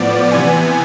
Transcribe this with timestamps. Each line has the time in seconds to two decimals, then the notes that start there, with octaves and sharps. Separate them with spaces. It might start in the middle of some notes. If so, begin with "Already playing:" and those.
Already playing: A2 F3 B3 D5
0.32 C3 E3 B3 G#5